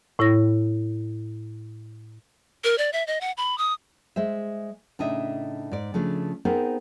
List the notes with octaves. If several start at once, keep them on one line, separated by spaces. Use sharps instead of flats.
A2 E4 C#5 A#6
A#4
D5
E5
D#5
F#5
B5
D#6
G#3 C5 E5
A2 C#3 D4 D#4 D#5 E5
G#2 D5
C#3 F3 A3 D4
B3 C4 D#4 G#4 A#4 C5